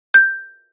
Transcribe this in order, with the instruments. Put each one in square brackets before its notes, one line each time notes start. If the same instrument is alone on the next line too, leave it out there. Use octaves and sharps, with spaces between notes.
[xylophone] G6